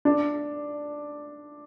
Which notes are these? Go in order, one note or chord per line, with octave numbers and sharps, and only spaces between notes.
D4